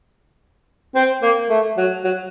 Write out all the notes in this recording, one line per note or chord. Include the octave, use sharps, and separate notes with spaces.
C4
A#3
A3
F#3
F#3